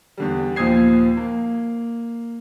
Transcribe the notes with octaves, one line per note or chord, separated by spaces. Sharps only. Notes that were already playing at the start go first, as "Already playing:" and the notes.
E2 D3 G3
D#2 A#2 F3 D#6 G#6 C7
A#3